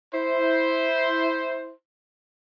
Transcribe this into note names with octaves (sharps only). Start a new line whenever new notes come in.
E4 C5